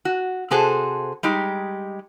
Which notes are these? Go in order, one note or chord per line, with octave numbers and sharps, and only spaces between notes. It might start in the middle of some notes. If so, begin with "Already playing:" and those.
F#4
C3 F#4 G#4 A4 C5
G3 G#3 D#4 G4